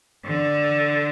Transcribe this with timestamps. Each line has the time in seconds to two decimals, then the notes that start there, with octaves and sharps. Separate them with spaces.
0.25 D3